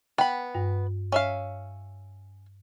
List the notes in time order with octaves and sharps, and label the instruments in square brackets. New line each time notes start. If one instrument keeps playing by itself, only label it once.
[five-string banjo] B3 B5 [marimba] G5
[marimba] G2
[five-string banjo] C#4 E5 F5